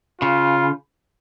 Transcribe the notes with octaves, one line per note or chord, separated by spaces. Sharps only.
C#3 F4